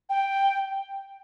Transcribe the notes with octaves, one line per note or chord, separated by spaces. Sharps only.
G5